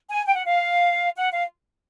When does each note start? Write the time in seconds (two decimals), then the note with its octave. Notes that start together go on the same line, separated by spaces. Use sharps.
0.10 G#5
0.25 G5
0.35 F#5
0.45 F5
1.16 F#5
1.33 F5